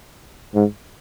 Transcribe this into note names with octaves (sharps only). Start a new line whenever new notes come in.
G#2